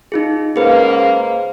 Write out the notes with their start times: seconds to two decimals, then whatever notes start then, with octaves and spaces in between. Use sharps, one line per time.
0.12 D#4 F4 G#4
0.56 G#2 C#3 A#3 G#4 B4 C5